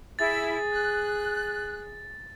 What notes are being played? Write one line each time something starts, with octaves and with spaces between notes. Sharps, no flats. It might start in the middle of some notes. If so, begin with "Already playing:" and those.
E4 G#4 A6
F#6